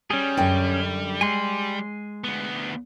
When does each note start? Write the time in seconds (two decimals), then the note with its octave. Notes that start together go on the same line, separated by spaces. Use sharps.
0.11 G3 C#4 G#4
0.37 F#2 D3 G5
1.21 G#3 G#5 C6
2.24 D2 B3